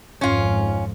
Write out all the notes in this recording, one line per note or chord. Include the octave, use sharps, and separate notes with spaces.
G#1 F2 G#2 C#4 F4